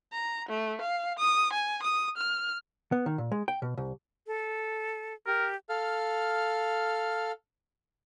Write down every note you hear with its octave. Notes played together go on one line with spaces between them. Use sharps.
A#5
A3
F5
D#6
G#5
D#6
F6
B3
D#3
A#2
G#3
G5
B2
C2
A4
G4 A#4
A4 F5 F6